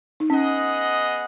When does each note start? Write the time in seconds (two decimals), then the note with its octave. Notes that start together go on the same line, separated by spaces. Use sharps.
0.20 D#4
0.30 B3 C#4 G#4 D#5 F#5